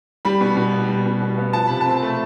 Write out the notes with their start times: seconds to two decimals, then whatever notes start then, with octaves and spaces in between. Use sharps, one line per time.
0.25 G3 B5
0.41 B2
0.57 B2
0.73 B3
0.89 G3
1.06 B2
1.22 B2
1.38 B3
1.53 F3 A5
1.67 C3 B5
1.81 C4 A5
2.03 A3